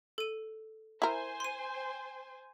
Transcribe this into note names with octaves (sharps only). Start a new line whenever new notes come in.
A4 D#7
E4 A#4 C5 G#5
C6 D#7